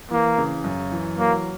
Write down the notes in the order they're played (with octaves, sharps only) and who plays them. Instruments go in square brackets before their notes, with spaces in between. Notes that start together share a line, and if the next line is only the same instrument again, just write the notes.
[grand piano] E3 [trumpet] A#3
[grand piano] C#3
F#2
E3
[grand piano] F#3 [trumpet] A#3